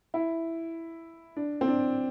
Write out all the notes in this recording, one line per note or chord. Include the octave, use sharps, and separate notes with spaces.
E4
D4
C4
D4